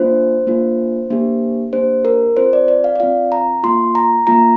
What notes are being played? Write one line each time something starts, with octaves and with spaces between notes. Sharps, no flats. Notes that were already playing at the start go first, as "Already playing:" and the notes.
Already playing: A#3 D4 F4 C5
A#3 D4 F4
A#3 D4 G4
A#3 D4 G4 C5
A#4
C4 F4 C5
D5
D5
F5
D5
C4 F4 F5
A#5
A#3 F4 C6
A#5
A#3 F4 A#5